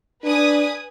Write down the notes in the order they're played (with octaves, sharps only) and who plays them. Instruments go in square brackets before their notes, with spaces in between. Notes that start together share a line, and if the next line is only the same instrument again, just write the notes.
[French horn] D4 [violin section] B4 G#5 D#6